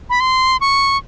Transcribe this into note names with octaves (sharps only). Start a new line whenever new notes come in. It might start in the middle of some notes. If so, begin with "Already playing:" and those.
B5
C6
C#6